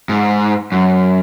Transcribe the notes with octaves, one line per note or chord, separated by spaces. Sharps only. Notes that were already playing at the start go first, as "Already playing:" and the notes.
G#2
F#2